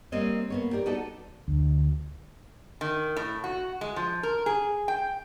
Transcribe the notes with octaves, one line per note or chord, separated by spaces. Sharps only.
G3 A#3 C4 C#5 D#5
A#3 B3 C#5
G4 A#4 D5
B3 D#4 F#4 A4 D5
D2
D#3
A2
F#4
G#3
F3
A#4
G#4
G5